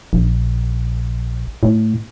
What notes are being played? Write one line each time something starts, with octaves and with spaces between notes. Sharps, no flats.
A#1
A2